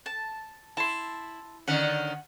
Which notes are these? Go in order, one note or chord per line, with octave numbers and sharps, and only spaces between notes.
A5
E4 A5 C6
D3 D#3 C#4 F#5